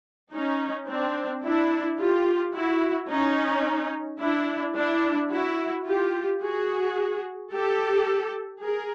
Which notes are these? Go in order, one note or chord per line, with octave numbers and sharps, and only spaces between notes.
C#4 D#4
C4 D4
D4 E4
F4 G4
E4 F#4
C#4 D#4
D4 E4
D4 E4
E4 F#4
F4 G4
F#4 G#4
G4 A4
G#4 A#4